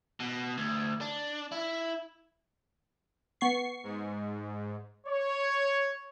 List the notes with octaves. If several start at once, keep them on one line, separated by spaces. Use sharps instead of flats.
B2
D2
D4
E4
B3 C#6 C7
G#2
C#5